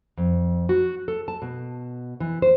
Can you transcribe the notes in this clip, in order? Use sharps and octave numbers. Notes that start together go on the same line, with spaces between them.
F2
F#4
A4
A5
B2
E3
C5